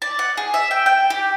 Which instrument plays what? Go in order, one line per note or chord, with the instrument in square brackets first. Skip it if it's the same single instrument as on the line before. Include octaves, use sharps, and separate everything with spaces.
[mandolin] D5
F#5
G#4
E5
G5
G5
G4